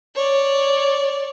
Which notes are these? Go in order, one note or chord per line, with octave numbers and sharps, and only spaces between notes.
C#5 D5